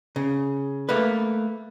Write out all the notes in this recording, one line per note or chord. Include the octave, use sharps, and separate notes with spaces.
C#3
A3 A#3 B4